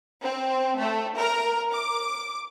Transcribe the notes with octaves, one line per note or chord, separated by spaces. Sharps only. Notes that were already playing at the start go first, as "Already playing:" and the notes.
C4
A3
A#4
D6